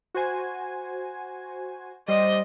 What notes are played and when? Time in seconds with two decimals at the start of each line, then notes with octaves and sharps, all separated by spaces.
0.15 F#4 C5 G#5
2.08 G3 C5 D5 D#5